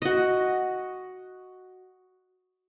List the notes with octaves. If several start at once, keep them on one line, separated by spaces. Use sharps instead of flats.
F#4 D#5